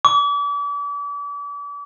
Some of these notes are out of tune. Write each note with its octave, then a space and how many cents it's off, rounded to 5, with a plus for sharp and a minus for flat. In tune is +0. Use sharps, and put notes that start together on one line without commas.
D6 -40